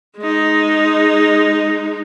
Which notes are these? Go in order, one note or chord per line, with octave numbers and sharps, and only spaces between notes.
G#3 D#4